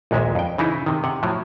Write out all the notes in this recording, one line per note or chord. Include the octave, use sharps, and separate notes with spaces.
A#1 D#2 A#2 G#3 E5
F2 G5
C#3 E3 D#4 E4
C3 D#3
C3 F#5
A2 F3 F#3